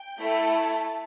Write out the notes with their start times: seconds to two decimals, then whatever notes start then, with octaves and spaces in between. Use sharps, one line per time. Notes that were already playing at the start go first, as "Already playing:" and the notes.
Already playing: G5
0.19 A3 E4 A4
0.53 A5